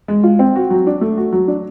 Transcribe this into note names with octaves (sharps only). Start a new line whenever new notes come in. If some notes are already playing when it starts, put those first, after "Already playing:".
G#3
F4
C4
F#4
F#3
D4
A3
F#4
F#3
D4